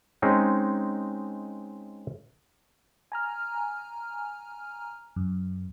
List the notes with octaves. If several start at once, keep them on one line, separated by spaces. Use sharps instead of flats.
G#3 C4 C#4 D#4
G#5 A#5 F6
F#2